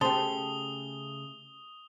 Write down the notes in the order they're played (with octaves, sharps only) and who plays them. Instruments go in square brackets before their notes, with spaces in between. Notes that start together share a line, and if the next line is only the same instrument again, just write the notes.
[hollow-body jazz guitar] C#3 A3 [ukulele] G4 C5 [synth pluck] A5 [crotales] D#6 G7